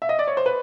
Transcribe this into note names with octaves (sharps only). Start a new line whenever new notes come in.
E5
D#5
D5
C#5
C5
B4